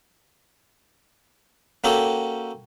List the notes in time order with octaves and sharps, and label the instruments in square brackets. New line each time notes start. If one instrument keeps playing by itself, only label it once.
[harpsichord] A#3 C#4 F#4 G4 A4